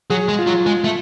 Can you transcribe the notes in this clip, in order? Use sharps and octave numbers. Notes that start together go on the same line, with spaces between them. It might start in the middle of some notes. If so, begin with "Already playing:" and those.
F#3 G#4
G#3
F4
F#3
G#3
A3